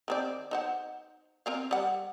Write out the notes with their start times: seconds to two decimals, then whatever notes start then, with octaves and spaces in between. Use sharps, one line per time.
0.08 D#3 C4 D5
0.51 D#4 C5 F#5
1.46 C4 A#4 F5
1.71 G3 F#5